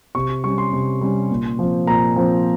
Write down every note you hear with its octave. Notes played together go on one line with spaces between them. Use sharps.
C3 C#6
G3 C#4 C#6
C6
C3
G3 C#4
A#2
F3 C4
A#2 A#5
F3 C4